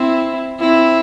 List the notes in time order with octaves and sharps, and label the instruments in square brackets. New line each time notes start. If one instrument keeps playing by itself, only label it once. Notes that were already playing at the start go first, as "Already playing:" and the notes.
Already playing: [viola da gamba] C4 E4
C4 E4